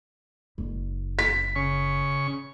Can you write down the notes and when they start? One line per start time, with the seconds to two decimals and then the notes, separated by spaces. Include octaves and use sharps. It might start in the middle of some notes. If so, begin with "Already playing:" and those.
0.58 F#1
1.19 B6
1.56 C#3 C#6